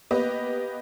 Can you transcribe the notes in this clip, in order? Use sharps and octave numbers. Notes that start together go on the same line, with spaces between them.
A#3 B3 G4 B4 D#5